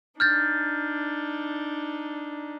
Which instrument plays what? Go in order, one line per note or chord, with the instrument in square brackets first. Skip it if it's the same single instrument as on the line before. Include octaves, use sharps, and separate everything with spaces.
[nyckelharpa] D4 D#4 [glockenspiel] F6 G6 A6